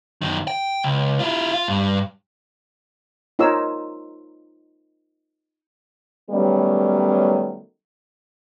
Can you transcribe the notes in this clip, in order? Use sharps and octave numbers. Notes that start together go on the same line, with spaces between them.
F#2 D#3
G5
C#2
E4 F4
F4
G2
D#4 F4 A#4 C#5 E6
D#3 F#3 G3 A3 B3 C#4